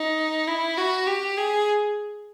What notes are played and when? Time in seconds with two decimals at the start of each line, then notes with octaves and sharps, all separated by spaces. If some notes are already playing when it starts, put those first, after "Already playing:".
Already playing: D#4
0.47 E4
0.78 F#4
1.07 G4
1.38 G#4